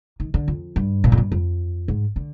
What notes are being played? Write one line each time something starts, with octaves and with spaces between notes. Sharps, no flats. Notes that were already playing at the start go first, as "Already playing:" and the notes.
D#3
D3
F2
G2
A#2
F2
G2
F2
G#2
D3